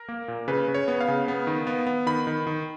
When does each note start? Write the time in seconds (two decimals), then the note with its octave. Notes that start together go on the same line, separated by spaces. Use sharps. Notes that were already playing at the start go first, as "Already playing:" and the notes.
Already playing: A#4
0.09 A#3
0.28 A#2
0.48 C#3 B4
0.68 C#3
0.75 C#5
0.88 B3
1.01 F5
1.08 C#3
1.28 B3
1.47 D#3
1.67 B3
1.87 B3
2.06 D#3 B5
2.27 D#3
2.47 D#3